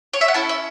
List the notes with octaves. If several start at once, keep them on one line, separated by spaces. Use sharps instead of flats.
C#5
E5
F#5
C#4 E4 A4 A5
E5